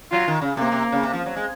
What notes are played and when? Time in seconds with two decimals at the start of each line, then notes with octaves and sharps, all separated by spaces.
0.12 F#3 F4
0.28 D#3
0.42 C#3
0.57 C3 A#3
0.72 C3
0.92 C#3
1.03 C3
1.13 F3
1.26 F#3
1.36 G#3